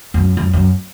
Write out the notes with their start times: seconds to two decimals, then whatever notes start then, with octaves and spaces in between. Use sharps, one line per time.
0.14 F#2
0.37 F#2
0.53 F#2